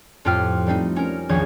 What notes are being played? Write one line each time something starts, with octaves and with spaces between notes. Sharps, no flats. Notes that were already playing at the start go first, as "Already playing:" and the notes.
F2 A2 F4 G4 G5 F6
G3 A3 C4 D#4
C#4 A#4
A#1 E2 D#3 C#5 C#6 G#6